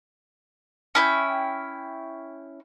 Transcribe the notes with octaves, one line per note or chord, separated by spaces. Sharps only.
C#4 E4 G5